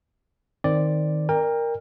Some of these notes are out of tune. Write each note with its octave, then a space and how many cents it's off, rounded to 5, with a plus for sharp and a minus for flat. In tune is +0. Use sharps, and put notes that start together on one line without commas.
D#3 +0 C4 +0 D5 +0
A#4 +0 D5 +35 G5 +30